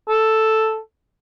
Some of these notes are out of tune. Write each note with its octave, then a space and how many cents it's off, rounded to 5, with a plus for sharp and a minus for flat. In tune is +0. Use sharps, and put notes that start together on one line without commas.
A4 +0